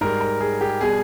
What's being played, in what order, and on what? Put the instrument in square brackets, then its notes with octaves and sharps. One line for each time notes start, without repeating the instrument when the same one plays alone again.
[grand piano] G#2 G3 A#4
A#4
G#4
G4
B2 G3 G#4